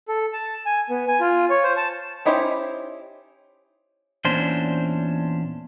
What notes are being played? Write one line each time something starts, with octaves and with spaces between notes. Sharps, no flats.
A4
A5
G#5
B3
G#5
F4
C#5
C5
A5
C#4 D#4 E4 G4 C5
E2 A#2 C#4 D4 C5